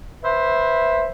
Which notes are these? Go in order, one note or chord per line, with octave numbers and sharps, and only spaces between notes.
B4 C5 E5